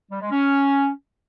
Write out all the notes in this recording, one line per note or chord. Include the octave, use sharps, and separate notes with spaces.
G3
G#3
C#4